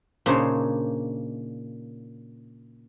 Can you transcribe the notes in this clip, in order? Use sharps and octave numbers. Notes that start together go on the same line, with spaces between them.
A#2 C#3 D4 D#4 C5 C#5